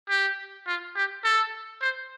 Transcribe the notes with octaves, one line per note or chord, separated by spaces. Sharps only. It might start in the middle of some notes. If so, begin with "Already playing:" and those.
G4
F4
G4
A4
C5